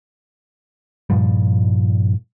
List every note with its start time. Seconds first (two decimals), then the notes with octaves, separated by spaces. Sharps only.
1.10 G2 A#2 F3 G3